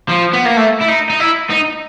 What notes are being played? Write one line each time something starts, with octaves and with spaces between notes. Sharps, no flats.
F3
B3
A#3
A3
E4
D#4
D#4
E4
D#4